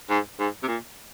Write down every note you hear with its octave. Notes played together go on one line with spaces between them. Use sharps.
G#2
G#2
C3
A#2